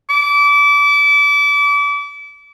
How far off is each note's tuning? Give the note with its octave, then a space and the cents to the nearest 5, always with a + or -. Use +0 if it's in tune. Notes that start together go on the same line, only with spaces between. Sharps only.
D6 -30